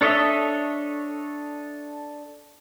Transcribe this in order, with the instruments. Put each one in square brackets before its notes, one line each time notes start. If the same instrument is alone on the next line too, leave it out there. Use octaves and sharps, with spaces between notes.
[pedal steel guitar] D4 A4 C#5 D#5 E5